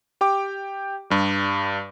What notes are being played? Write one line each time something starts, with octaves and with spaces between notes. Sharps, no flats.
G4 G5 D6
G2 G3